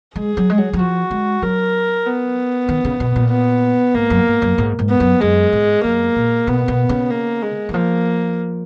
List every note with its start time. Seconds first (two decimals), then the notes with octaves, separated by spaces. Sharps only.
0.16 G#3 G#4
0.37 F#3
0.50 G#3
0.58 F#3
0.73 F#3
0.79 F3 F#4
1.11 G#3
1.42 F#3 A#4
2.06 B3
2.69 D#3
2.85 C#3
3.00 B2
3.16 A#2
3.31 B3
3.94 G#2 A#3
4.10 F#2
4.27 G#2
4.42 F#2
4.58 G#2
4.79 G#2
4.90 B3
5.00 F#2
5.21 F#2 G#3
5.53 G#2
5.84 F#2 A#3
6.16 A#2
6.47 B2 B3
6.68 B2
6.89 C#3
7.11 A#3
7.42 G#3
7.69 D#3
7.74 F3 A#3